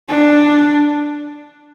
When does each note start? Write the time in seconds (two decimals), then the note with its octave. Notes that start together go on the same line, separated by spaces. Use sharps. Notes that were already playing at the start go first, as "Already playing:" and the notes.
0.09 D4